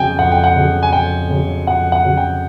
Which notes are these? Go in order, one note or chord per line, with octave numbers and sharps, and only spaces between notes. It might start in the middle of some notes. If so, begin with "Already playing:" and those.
Already playing: F2 C#3 F#3 G5 G#5
F2 F#5
G5
F#5
C#3 F#3
G#5
F2 G5
C#3 F#3
F2 F#5
F#5
C#3 F#3
G5